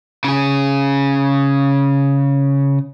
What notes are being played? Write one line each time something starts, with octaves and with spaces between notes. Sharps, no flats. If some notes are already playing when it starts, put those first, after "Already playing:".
C#3 G#4